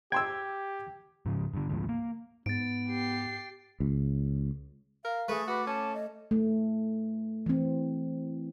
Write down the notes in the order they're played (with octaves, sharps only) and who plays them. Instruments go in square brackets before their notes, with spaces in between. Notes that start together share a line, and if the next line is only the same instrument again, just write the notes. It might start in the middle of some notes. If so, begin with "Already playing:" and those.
[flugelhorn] G4 [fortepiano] G5 C6 E6 [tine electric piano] G#6
[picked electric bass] G#2 C#3 F3
G2 D3
D2 G#2 F3
A#3
[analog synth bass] G#2 [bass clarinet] B3 [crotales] A6 D7
[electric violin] G4 C7
[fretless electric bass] C#2
[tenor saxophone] A#4 [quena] F5
[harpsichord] A3 [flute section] G#4 C#6 [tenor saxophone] B4
[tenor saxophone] F#4 [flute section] B4 [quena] D6
[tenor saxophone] C#4 [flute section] A5
[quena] D#5
[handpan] A3
E3 C4